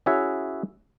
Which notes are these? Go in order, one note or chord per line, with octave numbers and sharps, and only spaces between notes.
C#4 E4 F#4 G#4 C#5 E5